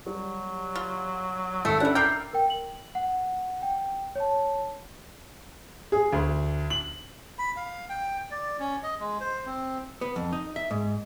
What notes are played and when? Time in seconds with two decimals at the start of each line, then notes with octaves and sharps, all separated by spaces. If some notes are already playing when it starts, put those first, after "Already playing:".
0.07 F#3 G3
0.75 F4
1.65 G#1 A3 A4 E6 C#7
1.80 G3 C#4 D4 E4 A4 F#5
1.95 A#4 D5 G5 F6 C7
2.33 A#4 G5
2.50 F#7
2.95 F#5
3.62 G5
4.15 C#5 A5
5.92 G#4
6.12 D2
6.70 F#7
7.39 B5
7.57 F5
7.89 G5
8.31 D5
8.60 C#4
8.83 D#5
9.00 G#3
9.20 C5
9.46 C4
10.01 B3
10.16 F2
10.33 D#4
10.56 E5
10.71 G#2